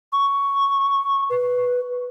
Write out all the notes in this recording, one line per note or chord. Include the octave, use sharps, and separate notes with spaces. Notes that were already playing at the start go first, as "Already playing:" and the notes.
C#6
B4